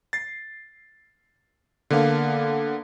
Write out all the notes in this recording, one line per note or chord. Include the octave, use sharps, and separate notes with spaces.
A6 C7
D3 A#3 B3 F5